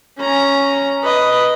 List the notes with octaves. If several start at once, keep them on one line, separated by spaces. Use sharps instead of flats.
C#4 A#5
B4 D#5